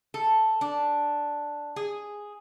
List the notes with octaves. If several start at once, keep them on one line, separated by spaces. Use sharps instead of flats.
A4
D4
G#4